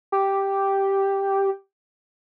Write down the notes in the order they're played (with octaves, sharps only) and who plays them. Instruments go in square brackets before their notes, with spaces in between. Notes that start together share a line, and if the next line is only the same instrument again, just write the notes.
[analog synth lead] G4